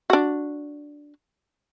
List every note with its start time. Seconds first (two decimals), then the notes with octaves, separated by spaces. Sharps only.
0.10 D4 F#4